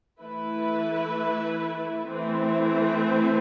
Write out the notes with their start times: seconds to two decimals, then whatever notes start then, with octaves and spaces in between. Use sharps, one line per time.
0.20 E3 A3 E4 B4
2.07 E3 A3 C4